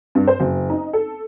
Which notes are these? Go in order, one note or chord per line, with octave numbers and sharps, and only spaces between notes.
G2
C5
F#1
D#4
A4